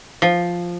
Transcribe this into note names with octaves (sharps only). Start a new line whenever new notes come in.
F3